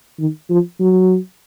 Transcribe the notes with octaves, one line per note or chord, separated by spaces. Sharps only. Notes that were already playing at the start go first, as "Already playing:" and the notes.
D#3
F3
F#3